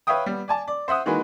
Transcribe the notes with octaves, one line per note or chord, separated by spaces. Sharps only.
B4 C#5 E5 F5 G5 D#6
G3 B3
D5 G#5 A5
D5
C5 E5 F#5 D#6
D#3 E3 G#3 A#3 F#4 B4